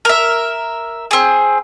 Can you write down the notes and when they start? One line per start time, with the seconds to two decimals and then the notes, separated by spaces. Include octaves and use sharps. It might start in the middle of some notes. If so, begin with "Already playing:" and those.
0.05 A#4 E5
1.11 C4 G#4